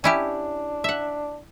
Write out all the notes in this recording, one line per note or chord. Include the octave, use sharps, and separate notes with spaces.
C#4 D4 E4 G4
E5 F#5